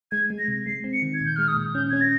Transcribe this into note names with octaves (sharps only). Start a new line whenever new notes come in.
G#3 G#6
G#3
A#6
C3
G#3 C7
C4
C#7
D#3
G#6
A#2 G6
G#3 F6
D#6
A#2
C#4 G6
C#4 G#6
A#6